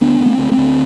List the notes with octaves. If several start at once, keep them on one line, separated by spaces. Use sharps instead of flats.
D2 B3 D4
D2
A3 C4
D2
A3 C4
D2